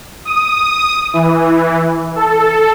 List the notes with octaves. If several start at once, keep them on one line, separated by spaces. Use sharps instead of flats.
D#6
E3
A4